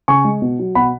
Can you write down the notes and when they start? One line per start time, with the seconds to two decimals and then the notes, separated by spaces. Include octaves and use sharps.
0.08 C#3 G#5 C#6
0.25 G#3
0.42 B2
0.59 F#3
0.75 B2 F#5 B5